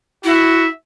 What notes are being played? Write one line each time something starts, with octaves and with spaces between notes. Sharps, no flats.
E4 F#4 E5